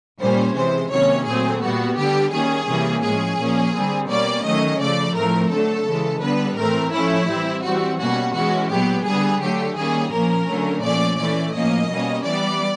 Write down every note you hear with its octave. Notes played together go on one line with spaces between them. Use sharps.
A#2 G3 A#3 C#4 C5
C3 E3 G#3 C5
C3 D#3 F#3 A#3 C#4 C#5
A#2 F#3 A3 C4 G#4
A#2 G3 B3 F#4
D3 G3 B3 G4
D#3 G3 A#3 C#4 G#4
C3 E3 G3 A#3 C#4
A2 F3 G#3 C#4 G#4
A#2 F3 A#3 C#4
D3 G3 C4
B2 G3 A#3 C#4 D5
D#3 F#3 A3 C#4 D#5
C#3 F3 A3 D5
A2 F3 A3 C4 A#4
D3 F#3 A3 A4
C#3 E3 G#3
D3 G3 B3 B4
A2 E3 A3 C4 A#4
A2 F3 A3 C#4 E4
E3 G3 C4
E3 G3 C4 F#4
B2 G3 A#3 C#4 F#4
E3 G#3 C#4 F#4
A#2 F#3 B3 G4
D3 G3 B3 G#4
D3 F#3 A3 G4
D#3 G3 A#3 C#4 G#4
A#2 F3 A#3 C#4 A#4
D3 F#3 A3 C#4
A#2 F3 A3 C#4 D5
E3 A3 C#4 D5
A2 F3 A#3 C#4 D#5
B2 G3 A#3 C#4
E3 G3 B3 D5